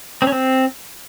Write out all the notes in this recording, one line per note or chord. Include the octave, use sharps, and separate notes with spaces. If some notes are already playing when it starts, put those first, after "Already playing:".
C4
C#4
C4